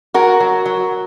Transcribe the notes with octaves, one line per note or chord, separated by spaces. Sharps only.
F#3 F#4 A#4
F#3
F#3